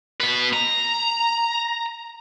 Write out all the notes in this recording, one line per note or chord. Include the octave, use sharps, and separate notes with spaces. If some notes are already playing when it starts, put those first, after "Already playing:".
B2 B4
A#5